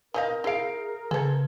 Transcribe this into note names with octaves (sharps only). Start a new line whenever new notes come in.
E3 A#4 D#5 F5 D#6 G6 A#6
E4 G#4 F5 C7 D7
C#3 G#4 A4 B4 C6 G#6